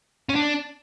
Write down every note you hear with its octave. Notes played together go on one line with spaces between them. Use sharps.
C#4
D4